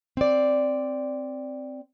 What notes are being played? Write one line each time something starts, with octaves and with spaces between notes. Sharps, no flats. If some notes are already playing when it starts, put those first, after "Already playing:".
C4 D5